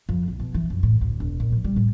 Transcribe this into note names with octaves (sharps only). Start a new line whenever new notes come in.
F2
B1
B2
E3
F#2
A2
D2
E1
A#2
F3
G3
A2